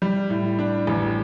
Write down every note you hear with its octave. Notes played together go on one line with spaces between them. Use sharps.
G3
A2
D4
A1